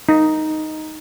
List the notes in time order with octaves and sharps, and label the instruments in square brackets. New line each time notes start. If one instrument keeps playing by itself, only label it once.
[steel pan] D#4